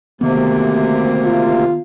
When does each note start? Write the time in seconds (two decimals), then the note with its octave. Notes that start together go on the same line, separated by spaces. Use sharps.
0.21 D2 C3 D#3 A#3 B3
1.24 F4